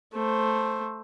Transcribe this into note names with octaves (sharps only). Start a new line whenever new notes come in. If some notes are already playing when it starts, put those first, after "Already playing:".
A3 C5